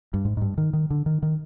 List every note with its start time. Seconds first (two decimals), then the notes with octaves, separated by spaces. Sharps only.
0.14 G2
0.25 G#2
0.37 G#2
0.41 G2
0.58 D#3
0.73 D#3
0.90 D3
1.06 D#3
1.23 D#3